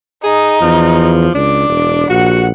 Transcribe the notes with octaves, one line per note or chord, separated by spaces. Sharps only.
D#4 G#4
E2 F3
C#2 D4 D6
E1
A#1 F#4 F#5